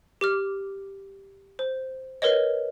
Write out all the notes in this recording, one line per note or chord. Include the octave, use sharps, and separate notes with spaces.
G4 D6 F6
C5
A#4 B4 C#5 D#5